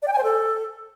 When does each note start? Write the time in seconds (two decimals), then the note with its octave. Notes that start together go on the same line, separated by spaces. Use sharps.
0.02 D5
0.08 G5
0.13 G#5
0.18 C5
0.23 A4